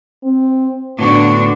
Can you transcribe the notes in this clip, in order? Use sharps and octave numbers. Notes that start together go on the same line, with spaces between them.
C4
A2 D3 B3 D4 F#4